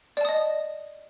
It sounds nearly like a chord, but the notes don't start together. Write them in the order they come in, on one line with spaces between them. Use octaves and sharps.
D5 A5 D#6 D#5